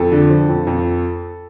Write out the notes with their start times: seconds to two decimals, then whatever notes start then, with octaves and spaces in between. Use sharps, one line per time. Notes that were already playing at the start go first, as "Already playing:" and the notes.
Already playing: F2 A4
0.12 D3
0.30 F3
0.49 F2
0.67 F2